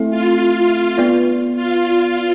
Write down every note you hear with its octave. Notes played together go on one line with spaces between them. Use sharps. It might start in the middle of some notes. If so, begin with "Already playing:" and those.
Already playing: A3 C4 E4 A4 E5
F4
B3 F4 B4 D5
F4